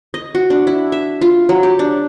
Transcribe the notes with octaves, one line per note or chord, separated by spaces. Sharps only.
D#5
F#4
D4
E4
E5
F4
F#3
G4
D4